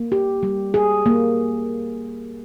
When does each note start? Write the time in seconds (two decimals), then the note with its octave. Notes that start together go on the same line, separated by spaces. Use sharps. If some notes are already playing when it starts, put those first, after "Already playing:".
Already playing: A#3
0.12 G4
0.43 G3
0.74 G#4
1.06 A#3